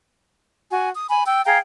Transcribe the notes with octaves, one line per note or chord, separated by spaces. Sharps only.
F#4 G#5
D#6
G#5 B5
G5 E6
G#4 F5 G5 A#5